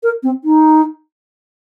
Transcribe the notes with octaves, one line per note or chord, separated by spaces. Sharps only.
A#4
C4
D#4